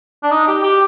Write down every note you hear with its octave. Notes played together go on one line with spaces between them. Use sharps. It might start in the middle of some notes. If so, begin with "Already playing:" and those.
D4
D#4
G4
G4